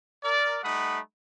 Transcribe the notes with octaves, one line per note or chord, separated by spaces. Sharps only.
A#4 D5
G3 A3 D#4 F#5 B5 D#6